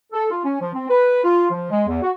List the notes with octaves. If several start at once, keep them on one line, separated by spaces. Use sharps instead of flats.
A4
F4
C#4
F3
C4
B4
F4
F3
G#3
E2
F#4